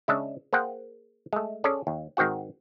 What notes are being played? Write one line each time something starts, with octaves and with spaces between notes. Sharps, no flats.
C#3 G#3 C#4 D4 E5
A#3 G#4 C5 F#5 G5
G#3 A3
C#4 G#4 A4 D5
D#2
G#2 D#3 C4 F#4 F#5